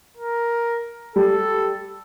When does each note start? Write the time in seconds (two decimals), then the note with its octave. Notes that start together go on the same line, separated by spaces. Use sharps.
0.17 A#4
1.16 G3 A4